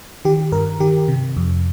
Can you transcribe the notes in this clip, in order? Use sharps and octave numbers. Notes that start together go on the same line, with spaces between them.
D#3 G4
G2 A#4
D#3 G4
C3
F2